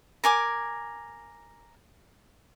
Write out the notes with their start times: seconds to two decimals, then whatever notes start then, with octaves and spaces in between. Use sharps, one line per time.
0.24 A#4 G#5 D6